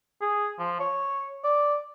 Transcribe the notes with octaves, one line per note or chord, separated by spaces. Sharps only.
G#4
F3
C#5
D5